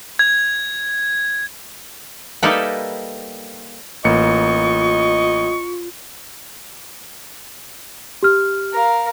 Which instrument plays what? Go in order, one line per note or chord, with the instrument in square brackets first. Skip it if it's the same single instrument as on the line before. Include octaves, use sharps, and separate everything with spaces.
[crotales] G#6
[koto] G3 A#3 D#4 E4 A4 B4
[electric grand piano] A1 A#3 C#7 [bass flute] F4 [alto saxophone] D#5 [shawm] C#6
[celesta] G4 F6
[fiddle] A#4 F5